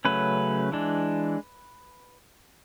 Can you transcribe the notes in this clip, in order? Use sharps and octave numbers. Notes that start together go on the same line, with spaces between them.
C#3 F#3 A3 C#4 B4
E3 G#3 D4